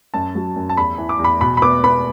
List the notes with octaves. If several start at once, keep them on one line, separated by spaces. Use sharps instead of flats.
F#2 A5
F#3
F#2
A5
E2 B5
E3
D6
E2
B5
B2 B5
B5
B3 D6
B3 B5